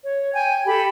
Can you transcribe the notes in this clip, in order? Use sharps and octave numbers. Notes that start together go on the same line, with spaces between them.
C#5
G5 G#5
G4 A4 B5